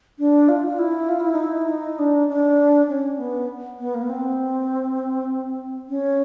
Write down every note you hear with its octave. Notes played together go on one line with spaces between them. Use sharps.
D4
F4
F4
E4
F4
E4
D#4
E4
D#4
D4
D4
C#4
B3
B3
A#3
B3
C4
C#4